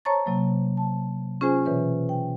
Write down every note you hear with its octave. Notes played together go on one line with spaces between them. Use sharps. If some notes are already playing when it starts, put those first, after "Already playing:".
C5 C#5 A5 A#5 C#6 A6
C3 F#3 A#3
A5
C#4 F4 G#4 C5 G#5
B2 E3 B4 C#5
G5